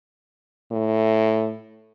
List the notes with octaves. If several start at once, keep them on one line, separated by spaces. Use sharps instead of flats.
A2